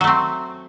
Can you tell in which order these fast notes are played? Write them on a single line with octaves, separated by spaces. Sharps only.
F#3 A3 C4